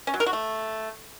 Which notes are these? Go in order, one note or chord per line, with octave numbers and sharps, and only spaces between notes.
C#4
F#3
A#4
F#4
A3